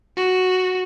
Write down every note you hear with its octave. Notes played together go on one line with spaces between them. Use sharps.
F#4